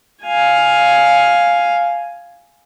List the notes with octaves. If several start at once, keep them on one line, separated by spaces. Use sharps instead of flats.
F5 G#5